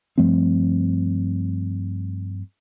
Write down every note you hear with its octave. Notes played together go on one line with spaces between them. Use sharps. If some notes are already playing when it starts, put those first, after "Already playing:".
G2 F3 A3 C4